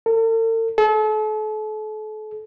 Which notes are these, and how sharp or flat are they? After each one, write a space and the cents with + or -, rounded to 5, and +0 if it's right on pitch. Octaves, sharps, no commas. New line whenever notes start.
A4 +45
A4 -40